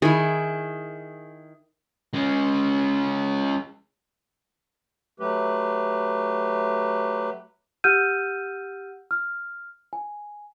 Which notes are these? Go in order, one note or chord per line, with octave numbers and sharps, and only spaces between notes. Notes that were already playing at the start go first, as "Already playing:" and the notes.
D#3 E4 G#4
G#3 C#4
F#3 A3 G4 B4
G4 F#5 E6 F6 G6 D#7
F6
G#5